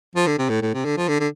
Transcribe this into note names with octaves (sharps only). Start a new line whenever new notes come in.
F3
D3
C3
A2
A2
C3
D3
F3
D3
D3